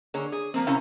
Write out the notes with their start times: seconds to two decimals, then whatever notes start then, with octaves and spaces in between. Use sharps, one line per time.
0.14 D3 A#3 G#4 C#5
0.32 G#4
0.54 F3 A#3 C4
0.67 C3 C#4 E4 A#4 F5